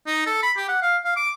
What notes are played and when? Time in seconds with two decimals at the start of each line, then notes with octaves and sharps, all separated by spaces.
0.07 D#4
0.26 A4
0.43 B5
0.57 G4
0.69 F#5
0.82 F5
1.05 F5
1.17 D6